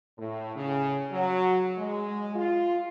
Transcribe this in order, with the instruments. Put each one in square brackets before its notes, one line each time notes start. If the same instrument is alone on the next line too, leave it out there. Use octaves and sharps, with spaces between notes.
[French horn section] A2
C#3
F#3
G#3
F4